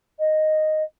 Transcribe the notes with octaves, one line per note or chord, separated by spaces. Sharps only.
D#5